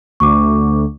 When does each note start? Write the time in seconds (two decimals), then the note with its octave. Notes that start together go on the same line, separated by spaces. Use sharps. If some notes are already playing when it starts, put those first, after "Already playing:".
0.20 D2 C#6 D6